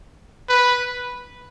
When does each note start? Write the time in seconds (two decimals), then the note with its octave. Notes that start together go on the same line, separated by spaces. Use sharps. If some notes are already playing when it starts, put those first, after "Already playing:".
0.49 B4